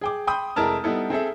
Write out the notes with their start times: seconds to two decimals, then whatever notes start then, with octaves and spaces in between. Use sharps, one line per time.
0.01 G#4 G5 D6
0.27 G5 B5 C6 D#6 G6
0.56 F1 G#3 E4 A#4 A5 F6
0.84 G3 B3 D#4 E4 A4
1.10 C4 G#4 A4 E5